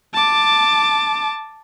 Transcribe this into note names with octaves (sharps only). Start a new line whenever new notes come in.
A5 D6